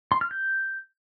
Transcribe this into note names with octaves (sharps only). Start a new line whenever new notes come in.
C6
F6
G6